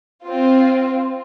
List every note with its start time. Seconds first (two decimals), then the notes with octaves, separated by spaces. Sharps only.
0.24 C4 F4